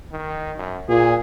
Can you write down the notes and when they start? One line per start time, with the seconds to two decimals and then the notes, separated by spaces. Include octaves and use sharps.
0.12 D#3
0.57 F#2
0.89 A#2 G#4